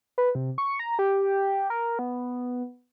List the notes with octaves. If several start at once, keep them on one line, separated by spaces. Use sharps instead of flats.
B4
C3
C#6
A#5
G4
A#4
B3